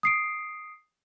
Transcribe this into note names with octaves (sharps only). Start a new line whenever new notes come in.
D#6 C7 D7